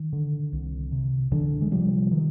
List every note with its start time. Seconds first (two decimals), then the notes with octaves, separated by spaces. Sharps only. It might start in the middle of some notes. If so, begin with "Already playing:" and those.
Already playing: D#3
0.13 D3
0.52 C2
0.92 C3
1.31 C2 D3 E3
1.61 G#3
1.71 C3 F3 G3
2.11 D#3